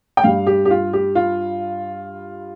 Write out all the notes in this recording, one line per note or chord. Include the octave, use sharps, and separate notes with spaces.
G5
G2 G3 F5
G4
G4
F4
G4
F4